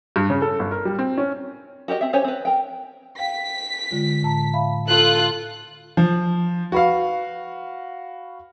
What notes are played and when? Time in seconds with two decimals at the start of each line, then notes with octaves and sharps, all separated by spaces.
0.16 G2
0.30 C#3
0.42 A4
0.59 G1
0.71 A#4
0.85 G3
0.99 C4
1.18 C#4
1.88 F#4 G4 A#4 D#5
2.01 C4 E5
2.13 C#4 G4 C5 C#5 G#5
2.24 C4 B4
2.45 A#4 G5
3.19 F5 G5 B6
3.91 D3 G#3 F4
4.23 A2 A5 A#5
4.54 E5 F5 B5
4.87 F4 A4 F#6
5.97 F3
6.72 F#4 B4 F5